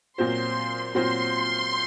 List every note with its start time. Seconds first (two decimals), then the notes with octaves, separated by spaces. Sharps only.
0.18 A#2 F#3 C4 F4 C5 C6
0.95 A#2 F#3 C4 F4 C5 C6